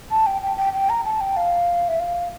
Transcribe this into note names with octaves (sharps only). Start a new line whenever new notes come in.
A5
G5
G5
G5
G5
A#5
A5
G5
F5
E5
F5